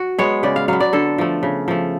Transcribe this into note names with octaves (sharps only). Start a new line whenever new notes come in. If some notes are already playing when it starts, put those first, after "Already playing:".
Already playing: F#4
G#3 B3 C#5
C#3 D5
F5
F#3 B3 F5
D5
D3 A4
F3 A3
C#3
F3 A3